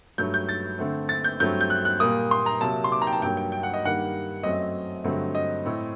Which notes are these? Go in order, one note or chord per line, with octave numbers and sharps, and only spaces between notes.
G2 F#3 A3 G6
G6
A6
D3 A3 C4
A6
G6
G2 F#3 A3 C4 G6
G6
F#6
F#6
A#2 G3 A#3 D#6
C6
A#5
C3 F#3 A#3 A5
C6
D6
A#5
G5
A5
G2 F#3 A#3 G5
G5
G5
F#5
D#5
G2 D#3 G3 A#3 F#5
F#2 F#3 A3 C4 D#5
G2 D3 F#3 A3 C4
D#5
A2 A3 C4